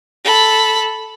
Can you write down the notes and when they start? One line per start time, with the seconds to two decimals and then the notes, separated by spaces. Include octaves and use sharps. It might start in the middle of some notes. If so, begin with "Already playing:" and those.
0.24 A4 B5